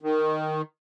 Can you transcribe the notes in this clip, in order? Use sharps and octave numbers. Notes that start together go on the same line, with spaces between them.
D#3